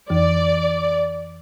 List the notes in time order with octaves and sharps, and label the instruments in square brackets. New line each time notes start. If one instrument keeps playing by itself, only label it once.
[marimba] F2 E3 [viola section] D5